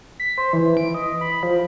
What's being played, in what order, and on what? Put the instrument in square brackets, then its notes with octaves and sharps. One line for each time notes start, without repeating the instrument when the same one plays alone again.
[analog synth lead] B6
C5
E3
D7
D#5
B5
F3